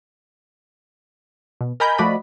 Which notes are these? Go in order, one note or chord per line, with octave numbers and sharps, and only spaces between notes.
B2
A#4 D#5 G#5 A#5 B5 G6
F3 A3 F#4 D5 D#5 B5